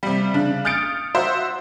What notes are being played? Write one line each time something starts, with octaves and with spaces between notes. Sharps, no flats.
C3 G3
C#3 D4
D#6 F6 G6 A6 C#7 D7
F#4 C5 E5